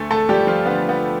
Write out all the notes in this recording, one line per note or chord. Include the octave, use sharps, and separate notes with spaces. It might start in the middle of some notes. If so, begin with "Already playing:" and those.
Already playing: D2 A3 A4
A3 A4
F3 G3 G4
F3 F4
D3 B3
B3